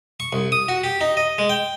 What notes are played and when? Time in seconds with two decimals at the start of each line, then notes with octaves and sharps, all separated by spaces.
0.20 C#6
0.33 C2
0.52 D#6
0.68 F#4
0.84 G4
1.01 D#4
1.17 D#5
1.38 G#3
1.50 G5